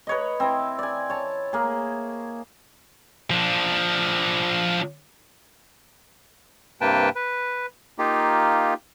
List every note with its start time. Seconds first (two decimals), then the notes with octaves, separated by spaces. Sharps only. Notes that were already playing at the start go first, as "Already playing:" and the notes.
0.07 B4 C#5 D#5
0.40 C4 E4
0.79 D5 G#5
1.10 C#5 A5
1.53 A#3 G#4
3.31 F3 D4
6.81 G2 C3 A#3 B4 G5 A5
7.15 B4
7.99 A#3 D#4 F4 G4